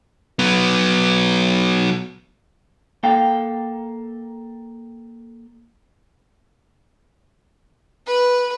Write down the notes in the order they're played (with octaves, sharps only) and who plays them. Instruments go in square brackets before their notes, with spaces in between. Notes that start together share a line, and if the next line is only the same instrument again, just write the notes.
[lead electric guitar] F#3 B3
[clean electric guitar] A#3 A4 F5 G5
[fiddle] B4